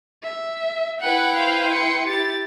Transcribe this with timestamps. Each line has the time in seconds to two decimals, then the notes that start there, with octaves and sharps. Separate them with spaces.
0.23 E5
1.00 E4 B4 F#5 G5
1.35 C5 F5
1.73 C6 C#7
2.07 E4 G4 A6